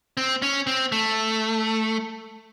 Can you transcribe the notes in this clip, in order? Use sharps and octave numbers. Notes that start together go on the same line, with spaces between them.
C4
C#4
C4
A3